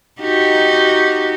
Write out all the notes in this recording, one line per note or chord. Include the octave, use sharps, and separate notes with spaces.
D#4 F#4 G4